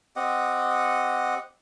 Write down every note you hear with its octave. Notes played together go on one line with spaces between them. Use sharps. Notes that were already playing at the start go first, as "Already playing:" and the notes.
C4 G4 D#5 F#5